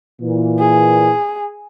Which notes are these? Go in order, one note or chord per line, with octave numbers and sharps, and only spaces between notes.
A#2 E3
G#4